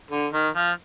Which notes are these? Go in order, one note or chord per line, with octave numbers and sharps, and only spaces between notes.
D3
D#3
F3